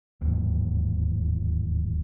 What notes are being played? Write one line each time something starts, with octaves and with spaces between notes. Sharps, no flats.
D1 D#2 G#2 E3